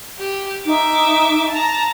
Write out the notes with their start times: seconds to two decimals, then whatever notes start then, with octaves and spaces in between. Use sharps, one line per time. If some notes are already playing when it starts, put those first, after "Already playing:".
0.19 G4
0.66 D#4 E5 D6
1.50 A5 A#5